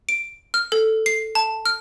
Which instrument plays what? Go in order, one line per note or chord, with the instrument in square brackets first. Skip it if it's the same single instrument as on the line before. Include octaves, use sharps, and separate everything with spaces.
[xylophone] D7
F6
A4
C7
A5
F6